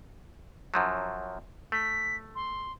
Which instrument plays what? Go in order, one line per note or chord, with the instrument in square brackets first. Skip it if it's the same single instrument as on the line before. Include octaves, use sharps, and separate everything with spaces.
[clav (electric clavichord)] F#2 F3 F#3
[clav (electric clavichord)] A3 [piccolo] B6
[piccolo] C6